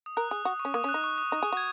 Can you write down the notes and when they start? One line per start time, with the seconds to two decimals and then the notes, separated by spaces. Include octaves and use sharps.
0.06 D#6
0.17 A#4 F#6
0.31 G#4 D#6
0.45 F#4 D#6
0.60 C#6
0.65 C#4
0.74 A#3 D#6
0.84 C#4
0.89 F#6
0.94 D#4
1.04 C#6
1.18 D#6
1.32 D#4 D#6
1.43 G#4
1.52 F#4 G#6